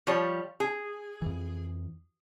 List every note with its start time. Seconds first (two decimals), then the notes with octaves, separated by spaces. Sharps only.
0.07 F3 G3 C#5
0.60 G#4
1.22 F2 E3